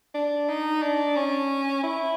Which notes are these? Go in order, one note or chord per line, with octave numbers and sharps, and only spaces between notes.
D4
D#4
D4
C#4
E4